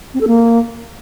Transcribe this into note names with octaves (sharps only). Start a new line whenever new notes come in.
C4
A4
A#3